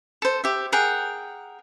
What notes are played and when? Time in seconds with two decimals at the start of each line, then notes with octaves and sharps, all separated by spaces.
0.22 A4 C5
0.44 G4 E5
0.72 G#4 A#4 F#5 G5